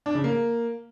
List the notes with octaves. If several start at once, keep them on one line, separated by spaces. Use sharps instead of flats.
D4
C#3
A#3